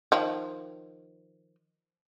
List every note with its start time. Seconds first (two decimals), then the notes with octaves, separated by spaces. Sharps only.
0.12 D#3 F3